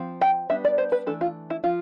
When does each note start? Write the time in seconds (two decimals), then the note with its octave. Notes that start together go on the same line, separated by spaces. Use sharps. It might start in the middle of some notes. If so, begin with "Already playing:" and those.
Already playing: F3 C4
0.21 G5
0.50 G3 B3 D4 E5
0.65 D5
0.78 C5
0.92 B4
1.07 E3 A3 D4 A4
1.21 F4
1.50 E4
1.64 F3 F4